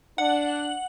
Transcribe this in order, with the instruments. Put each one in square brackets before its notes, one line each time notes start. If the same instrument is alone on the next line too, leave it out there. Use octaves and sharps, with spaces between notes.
[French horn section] D4 [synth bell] F#5